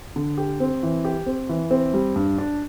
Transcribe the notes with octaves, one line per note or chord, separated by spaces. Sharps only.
D3
G4
C4
E3
G4
C4
E3
C4
G3
G2
D4